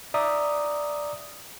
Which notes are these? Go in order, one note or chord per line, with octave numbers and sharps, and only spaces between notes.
D5 E5 A#5 D6 D#6